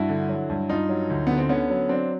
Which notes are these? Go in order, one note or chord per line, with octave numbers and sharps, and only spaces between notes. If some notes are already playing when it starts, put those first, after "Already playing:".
Already playing: G2 E4 F#4
D3
F#3
G2
G2 D#4 F4
F#3
D2
D3 B3
C4
D3 B3 C#4
F#3
F#3 C4 D4